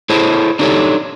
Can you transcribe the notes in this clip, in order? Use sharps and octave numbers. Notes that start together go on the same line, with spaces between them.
E4 G#4 A4 C5 C#5
D4 D#4 G4 A4 C#5